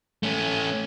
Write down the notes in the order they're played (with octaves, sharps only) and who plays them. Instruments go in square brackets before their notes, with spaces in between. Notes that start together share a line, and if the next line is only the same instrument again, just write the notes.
[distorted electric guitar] A3 C#4